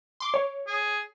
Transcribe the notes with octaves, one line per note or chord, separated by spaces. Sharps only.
C6 D6
C#5
G#4